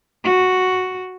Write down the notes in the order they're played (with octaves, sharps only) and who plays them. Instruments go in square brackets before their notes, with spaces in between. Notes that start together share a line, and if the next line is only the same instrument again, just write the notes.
[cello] F#4